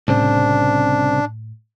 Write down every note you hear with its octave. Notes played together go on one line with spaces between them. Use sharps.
C2 A2 C#3 C4 D4